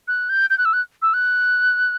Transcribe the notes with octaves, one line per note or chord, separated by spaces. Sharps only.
F#6
G6
G6
F#6
E6
F#6
E6
F#6